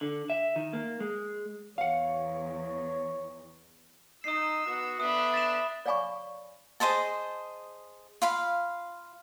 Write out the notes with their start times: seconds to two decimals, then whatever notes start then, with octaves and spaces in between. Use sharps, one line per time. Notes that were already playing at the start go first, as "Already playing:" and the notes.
0.01 D3
0.30 E5
0.56 D#3
0.73 A#3
1.00 G#3
1.78 E2 C#5 F5 F#5
4.24 D#4 D#6 E6 C7
4.65 B3 F#4
5.00 D3 B3 D4 E5 B5 D#6
5.34 A6 E7
5.86 C#5 D5 F5 G#5 B5 C#6
6.80 G#4 C5 D#5 A5
8.22 F4 F5 B5